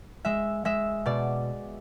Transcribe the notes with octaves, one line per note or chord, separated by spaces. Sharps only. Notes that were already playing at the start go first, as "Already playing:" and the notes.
G#3 E5
G#3 E5
B2 D5